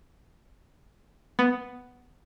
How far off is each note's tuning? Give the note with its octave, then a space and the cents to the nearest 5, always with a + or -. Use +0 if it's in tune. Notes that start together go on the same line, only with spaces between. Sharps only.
B3 +5